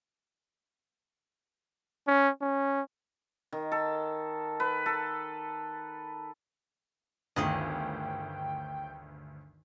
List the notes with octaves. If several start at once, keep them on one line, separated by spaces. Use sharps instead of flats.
C#4
C#4
D#3
A4
B4
A4
G1 D2 D#3 G#4 D#5 G5